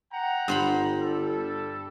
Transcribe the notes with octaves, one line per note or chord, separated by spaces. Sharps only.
F#5 G5 A#5
G1 G2 C5 B5
G3 A4